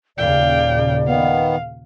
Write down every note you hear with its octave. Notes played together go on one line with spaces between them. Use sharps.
D#2 A#2 C#3 D5 F5 G5
D#3 B3 F5